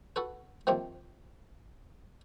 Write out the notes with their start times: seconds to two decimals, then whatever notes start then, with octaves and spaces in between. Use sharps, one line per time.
0.16 F#4 A4 B4
0.67 C3 D#3 F3 A#3 C4